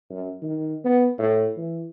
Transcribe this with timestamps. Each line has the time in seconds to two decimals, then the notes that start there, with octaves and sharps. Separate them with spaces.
0.10 F#2
0.43 D#3
0.85 B3
1.19 A2
1.58 E3